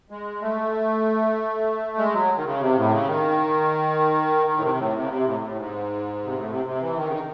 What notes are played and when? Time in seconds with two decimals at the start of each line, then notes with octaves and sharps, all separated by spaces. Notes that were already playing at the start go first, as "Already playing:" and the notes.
0.11 G#3
0.41 A3
1.98 G#3
2.14 F#3
2.37 D#3
2.45 C#3
2.60 C3
2.76 A2
2.91 C#3
3.07 D#3
4.47 D#3
4.56 A2
4.62 C3
4.78 A2
4.94 C3
5.02 C#3
5.09 C3
5.25 A2
5.41 A2
5.56 G#2
6.24 C3
6.34 A2
6.50 C3
6.65 C3
6.81 E3
6.96 D#3
7.08 C#3
7.12 D#3